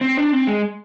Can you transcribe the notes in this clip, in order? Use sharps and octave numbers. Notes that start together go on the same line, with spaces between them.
C4
D4
C4
G#3